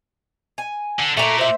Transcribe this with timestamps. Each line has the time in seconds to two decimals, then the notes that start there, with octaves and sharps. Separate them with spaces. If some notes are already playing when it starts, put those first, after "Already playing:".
0.58 G#5
0.99 D3
1.17 A#2 A3 A#5
1.38 C5 E5